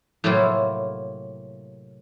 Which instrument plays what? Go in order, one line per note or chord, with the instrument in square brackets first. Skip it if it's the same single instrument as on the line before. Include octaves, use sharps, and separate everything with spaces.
[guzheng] A2 C3 F#3 A#3 E4 F4